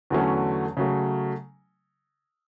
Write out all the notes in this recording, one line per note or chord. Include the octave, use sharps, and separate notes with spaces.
E2 D3 F#3 A3 C#4
C#3 F#3 A3